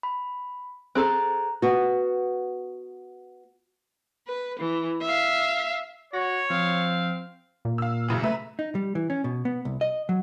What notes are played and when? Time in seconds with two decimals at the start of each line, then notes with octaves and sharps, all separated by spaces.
0.03 B5
0.95 C4 G#4 A4 A#5 F#6
1.62 B3 F#4
4.27 B4
4.59 E3
5.02 E5 F5
6.14 F#4 C#5 A#6
6.50 F3 C4 F5
7.65 A#2
7.78 F5 E6
8.08 F#2 C#3 E3
8.23 A3 B4 E5 A#5
8.59 D#4
8.75 G3
8.95 E3
9.10 C#4
9.24 B2
9.45 B3
9.65 C2
9.81 D#5
10.09 F#3